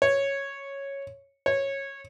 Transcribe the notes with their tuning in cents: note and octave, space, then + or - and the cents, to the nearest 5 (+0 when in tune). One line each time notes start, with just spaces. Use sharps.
C#5 -5
C#5 -15